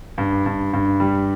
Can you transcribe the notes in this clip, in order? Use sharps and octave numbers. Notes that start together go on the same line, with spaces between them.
G2
G2
G2
G3